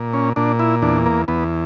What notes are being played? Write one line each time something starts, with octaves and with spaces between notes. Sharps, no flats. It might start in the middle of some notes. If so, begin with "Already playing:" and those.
Already playing: A#2
C#4
A#2 D4
E4
E2 D4
A#3
E2 B3